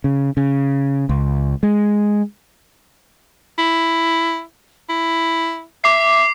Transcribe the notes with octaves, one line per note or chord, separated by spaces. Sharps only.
C#3
C#3
C#2
G#3
E4
E4
E5 D6 C7